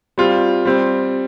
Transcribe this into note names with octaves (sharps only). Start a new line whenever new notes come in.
G3 C4 F4
G3 C4